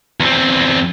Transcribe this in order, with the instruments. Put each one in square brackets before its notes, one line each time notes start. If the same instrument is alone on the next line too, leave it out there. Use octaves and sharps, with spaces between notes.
[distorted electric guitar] E2 C4